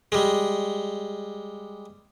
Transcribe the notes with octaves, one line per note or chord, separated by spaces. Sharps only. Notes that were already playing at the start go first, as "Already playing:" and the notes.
G3 G#3